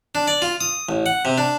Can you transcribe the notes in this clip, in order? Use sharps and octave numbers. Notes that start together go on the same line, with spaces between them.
D4
D5
F4
D#6
A1
F#5
C3
D4